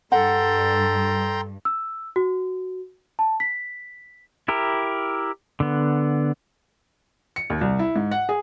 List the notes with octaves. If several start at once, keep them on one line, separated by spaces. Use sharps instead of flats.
G2 A4 F#5 G5 A#5 C6
E6
F#4
A5
B6
E4 G4 A#4
D3 B3
C#7
D#2
C2
E4
G#2
F#5
G#4